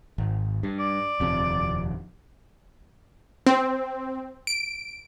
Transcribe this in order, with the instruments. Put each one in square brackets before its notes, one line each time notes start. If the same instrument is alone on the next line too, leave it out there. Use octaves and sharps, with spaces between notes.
[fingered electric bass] G#1
G2
[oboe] D5
[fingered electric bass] D#1 F2 C3
[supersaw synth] C4
D7